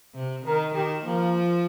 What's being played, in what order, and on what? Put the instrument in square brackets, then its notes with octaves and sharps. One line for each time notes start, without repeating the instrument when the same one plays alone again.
[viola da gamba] C3
[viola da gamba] D#3 [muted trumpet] A#4
[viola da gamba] D#3 [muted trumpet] G4
[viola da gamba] F3 [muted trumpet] A#3